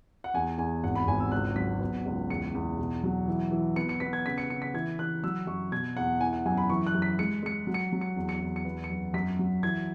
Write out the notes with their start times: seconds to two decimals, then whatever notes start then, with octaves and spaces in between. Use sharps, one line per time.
0.24 F#5
0.34 E2 G#5
0.58 E2 G#5
0.84 G#1 F#5
0.95 B5
1.07 G#1 G#5
1.20 E6
1.32 C#2 F#6
1.56 F#3 B6
1.80 B3
2.06 C#2
2.30 E2 C#7
2.54 E2
2.78 B2
3.03 F#3
3.28 E3
3.51 E3
3.76 B3 C#7
3.89 C#7
4.00 B3 B6
4.13 G#6
4.26 C#3 B6
4.38 C#7
4.50 C#3 C#7
4.62 B6
4.74 E3 G#6
4.99 E3 F#6
5.24 F#3 E6
5.47 F#2 C#6
5.72 B2 G#6
5.96 E2 F#5
6.21 E3 G#5
6.33 F#5
6.46 F#2 G#5
6.57 B5
6.70 E3 C#6
6.87 F#6
6.95 F#2
7.02 B6
7.19 G#3 C#7
7.43 G#3 C#7
7.67 F#3
7.74 C#7
7.92 F#3
8.01 C#7
8.16 E2
8.29 C#7
8.41 E2
8.56 C#7
8.65 B3
8.84 C#7
8.90 F#2
9.14 F#2 B6
9.39 F#3
9.63 E3 G#6